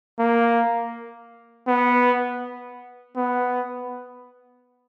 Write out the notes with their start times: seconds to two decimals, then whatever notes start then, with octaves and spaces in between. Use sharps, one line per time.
0.19 A#3
1.67 B3
3.16 B3